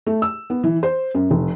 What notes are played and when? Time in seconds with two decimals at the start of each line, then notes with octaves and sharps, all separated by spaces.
0.07 A3
0.22 E6
0.50 B3
0.64 E3
0.83 C5
1.15 F#2
1.31 F1